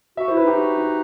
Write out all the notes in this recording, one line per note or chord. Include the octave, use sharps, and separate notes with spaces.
F#4 E5
E4 C5
B4
D#4 G4
F#4
F#4